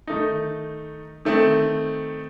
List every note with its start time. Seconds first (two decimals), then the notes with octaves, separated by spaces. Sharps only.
0.07 D#3 A3 D#4
1.25 D#3 A3 C4